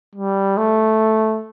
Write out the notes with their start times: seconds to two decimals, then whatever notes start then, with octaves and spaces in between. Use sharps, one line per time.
0.15 G3
0.58 A3